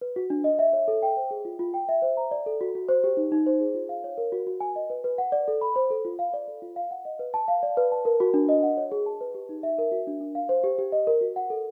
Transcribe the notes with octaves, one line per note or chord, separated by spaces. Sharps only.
B4
F#4
D4
D#5
E5
C#5
A4
G5
C5
G#4
F4
F4
G5
E5
C5
A#5
D5
A4
F#4
F#4
C5
G4
D#4
D#4
C5
G#4
F4
F5
C#5
A#4
F#4
F#4
G#5
D#5
B4
B4
F#5
D5
A4
B5
C5
A4
F4
F5
D5
A4
F4
F5
F#5
D#5
B4
A5
F5
D5
B4
A5
A#4
F#4
D4
D#5
F#5
C#5
G#4
A5
B4
G4
D#4
E5
A#4
F#4
D4
D4
F5
C5
G4
G4
D#5
A#4
F#4
F#5
A4